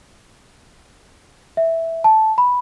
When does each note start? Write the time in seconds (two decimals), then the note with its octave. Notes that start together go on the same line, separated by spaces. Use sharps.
1.57 E5
2.04 A5
2.38 B5